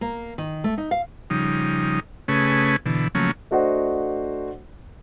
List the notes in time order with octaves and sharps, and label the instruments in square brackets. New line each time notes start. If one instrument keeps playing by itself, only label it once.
[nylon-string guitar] A#3
D#3
A3
D#4
F5
[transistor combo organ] C#3 F3 G3 D#4
C#3 A3 C#4 G#4 B4
B2 D3 E3
C#3 F3 F#3 A3 A#3 C#4
[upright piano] A3 D4 F#4 C5 D#5 F#5